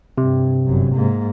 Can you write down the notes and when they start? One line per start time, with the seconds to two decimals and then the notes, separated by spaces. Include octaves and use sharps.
0.18 G2 C3
0.66 G1 F#2
0.95 G#2 A#3